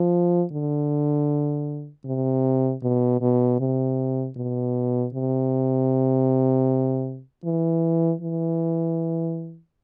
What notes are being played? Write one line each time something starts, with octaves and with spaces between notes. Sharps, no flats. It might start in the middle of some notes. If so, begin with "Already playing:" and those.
Already playing: F3
D3
C3
B2
B2
C3
B2
C3
E3
E3